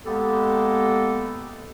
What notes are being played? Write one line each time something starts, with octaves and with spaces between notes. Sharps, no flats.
G#3 A#3 B3 G4 A4